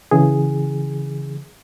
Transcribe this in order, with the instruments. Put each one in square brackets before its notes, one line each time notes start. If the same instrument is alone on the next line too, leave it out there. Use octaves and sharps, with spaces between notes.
[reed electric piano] C#3 E3 G#4